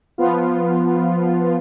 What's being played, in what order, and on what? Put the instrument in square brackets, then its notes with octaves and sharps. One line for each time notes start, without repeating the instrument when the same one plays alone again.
[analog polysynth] F3 B3 F4